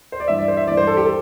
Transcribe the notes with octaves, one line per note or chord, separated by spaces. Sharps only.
C5
D5
G2 E3 E5
D5
C5
E5
G2 E3 D5
C5
A4
G4
A4